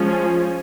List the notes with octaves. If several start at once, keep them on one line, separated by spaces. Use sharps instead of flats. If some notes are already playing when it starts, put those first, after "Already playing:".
Already playing: F3 G#3 C#4